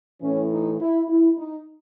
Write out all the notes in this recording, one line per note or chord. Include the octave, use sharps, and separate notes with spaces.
A2 E3 C#4
D#4
E4
E4
D#4